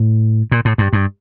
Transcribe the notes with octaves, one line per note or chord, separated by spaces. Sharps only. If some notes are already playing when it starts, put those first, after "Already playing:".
Already playing: A2
A#2
A2
G2
G2